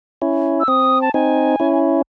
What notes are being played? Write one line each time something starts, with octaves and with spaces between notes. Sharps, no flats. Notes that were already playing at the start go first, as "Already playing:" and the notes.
C#4 E4
E6
C4 D#6
A5
C4 D#4 G#5
C#4 E4